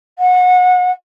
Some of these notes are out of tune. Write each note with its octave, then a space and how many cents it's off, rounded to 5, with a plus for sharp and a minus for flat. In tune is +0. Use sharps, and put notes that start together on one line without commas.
F#5 -30